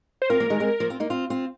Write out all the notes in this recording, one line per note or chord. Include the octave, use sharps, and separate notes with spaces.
C5
C4 F4 A#4
F3 A#3
D#3 G#3
G#3 C4
F3 A#3
C4 F4
A#3 D#4
C4 F4
C4 F4